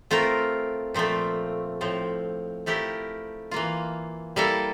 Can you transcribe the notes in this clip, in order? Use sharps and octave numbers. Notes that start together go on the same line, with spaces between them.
A3 C4 F4 A#4
A#2 F3 A3 C4
A2 F3 C4
F3 A3 E4 G4 A#4
E3 A#3 F4
G3 A#3 E4 A4